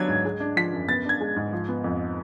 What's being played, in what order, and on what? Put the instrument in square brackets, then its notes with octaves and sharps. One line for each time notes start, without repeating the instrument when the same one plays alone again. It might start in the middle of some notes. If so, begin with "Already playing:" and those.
Already playing: [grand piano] F#3 B3 D4 G#6
G#2
G#3
D4
F3 B6
F#2
B3 A6
D4 G#6
G#3
G#2
F3
B3
F2